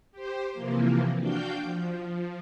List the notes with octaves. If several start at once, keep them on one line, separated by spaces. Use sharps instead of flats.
G4 C5
C3 E3 F3 A#3
D4 F#4 F5 G5 G6
F3